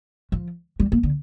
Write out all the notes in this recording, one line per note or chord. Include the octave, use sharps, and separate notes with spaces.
F3
G3
A#3
D3